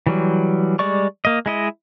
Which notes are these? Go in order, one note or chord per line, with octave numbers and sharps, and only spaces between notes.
E3 F#3 G3
G3 G#3 D5 C#6
A#3 D#5
G#3 E4 D#5